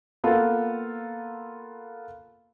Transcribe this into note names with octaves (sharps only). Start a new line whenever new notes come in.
A#3 B3 F4 A4